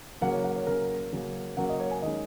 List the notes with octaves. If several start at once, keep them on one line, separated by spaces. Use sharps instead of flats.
C#3 F#3 A#3 C#4 F#5
C#5
F#5
C#5
C#3 F#3 A#3 C#4 A#4
C#3 F#3 A#3 C#4
C#3 F#3 A#3 C#4 F#5
D#5
C#5
G#5
D#3 G#3 C#4 D#5